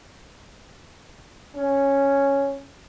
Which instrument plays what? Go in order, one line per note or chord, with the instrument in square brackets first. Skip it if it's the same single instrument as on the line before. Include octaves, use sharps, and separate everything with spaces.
[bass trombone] C#4